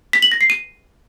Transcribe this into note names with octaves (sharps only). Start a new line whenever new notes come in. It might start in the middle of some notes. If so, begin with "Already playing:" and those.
B6
F#7
A#6
C7
D#7